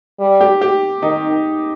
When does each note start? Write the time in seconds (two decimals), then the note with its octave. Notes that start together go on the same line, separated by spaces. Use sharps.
0.20 G3
0.41 G4
0.61 G4
1.02 D#3 D#4